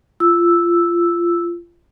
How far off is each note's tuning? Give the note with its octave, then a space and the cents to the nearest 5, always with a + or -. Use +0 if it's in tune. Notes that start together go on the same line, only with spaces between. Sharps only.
F4 -20 E6 +0